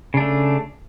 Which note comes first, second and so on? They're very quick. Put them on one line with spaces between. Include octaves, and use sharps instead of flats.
C#3 D4 A3